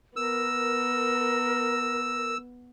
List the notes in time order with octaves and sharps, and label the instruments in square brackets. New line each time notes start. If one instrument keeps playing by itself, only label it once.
[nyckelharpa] B3 [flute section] A#4 [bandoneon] E6